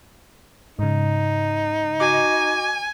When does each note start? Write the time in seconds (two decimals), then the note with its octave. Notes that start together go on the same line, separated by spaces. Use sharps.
0.79 G#2 C#3 D#4
2.00 F#4 D#5 G#5 D6